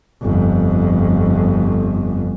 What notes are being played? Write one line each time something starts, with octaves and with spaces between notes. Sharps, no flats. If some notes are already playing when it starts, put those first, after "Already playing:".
G1 F2